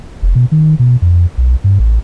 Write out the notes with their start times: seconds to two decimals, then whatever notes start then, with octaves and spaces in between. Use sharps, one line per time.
0.22 F1
0.35 B2
0.52 D#3
0.79 B2
1.02 F2
1.38 B1
1.64 G2
1.79 A1